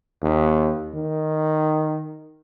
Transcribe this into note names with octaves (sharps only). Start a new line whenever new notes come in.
D#2
D#3